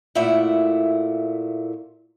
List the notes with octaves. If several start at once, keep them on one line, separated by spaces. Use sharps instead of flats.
A#2 A3 E4 E5 F#5